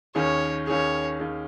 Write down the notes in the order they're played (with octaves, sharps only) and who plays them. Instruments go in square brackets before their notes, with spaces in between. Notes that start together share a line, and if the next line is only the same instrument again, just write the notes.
[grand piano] D#2 D#3 C#4 G#4 [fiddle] C#5
[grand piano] D#2 D#3 C#4 G#4 [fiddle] C#5
[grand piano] D#2 D#3 C#4 G#4